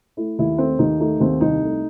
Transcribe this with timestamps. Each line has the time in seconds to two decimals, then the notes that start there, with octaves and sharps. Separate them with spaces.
0.17 A3 E4
0.39 D#2 E4
0.58 A3 C4
0.79 D#2 D#4
1.00 A3 D#4
1.20 D#2 C4
1.41 C2 D#4
1.63 A3